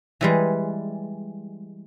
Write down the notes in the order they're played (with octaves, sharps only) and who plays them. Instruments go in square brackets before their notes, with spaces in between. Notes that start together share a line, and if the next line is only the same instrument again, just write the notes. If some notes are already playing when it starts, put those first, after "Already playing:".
[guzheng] E3 G3 G#3